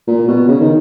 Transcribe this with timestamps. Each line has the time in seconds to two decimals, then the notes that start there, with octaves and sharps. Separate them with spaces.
0.07 A#2
0.28 B2
0.48 C#3
0.60 D#3